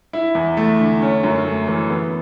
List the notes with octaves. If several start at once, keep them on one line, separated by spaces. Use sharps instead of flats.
E4
E2
A3
D3
C#4
F#2
A3
E3
B3